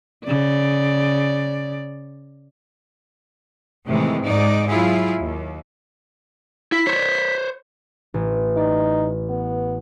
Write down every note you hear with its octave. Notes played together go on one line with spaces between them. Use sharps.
C#3 D5
A2 C3 D#3 E3 G#3
G#2 D#4 D5
F#3 E4 F4 G#4
D#2
E4 B6
C5 C#5
A1
D#4 D5
B3